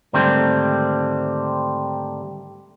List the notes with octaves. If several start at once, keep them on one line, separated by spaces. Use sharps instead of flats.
G#2 D3 D#3 G3 A3 C4